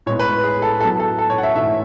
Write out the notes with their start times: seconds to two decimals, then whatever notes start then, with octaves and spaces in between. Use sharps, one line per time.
0.06 A2 G#3 B3 C#5
0.19 B4
0.44 G#4
0.62 A4
0.80 A2 F#3 B3 A4
1.00 A4
1.18 A4
1.30 C#5
1.38 F#5
1.43 E5
1.55 G#2 E3 A3 E5